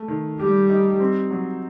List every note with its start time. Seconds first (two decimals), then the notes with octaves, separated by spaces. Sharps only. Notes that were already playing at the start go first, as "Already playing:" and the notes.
Already playing: A3
0.08 D#3
0.39 G3 G4
0.70 D#4
1.00 C4
1.30 F#3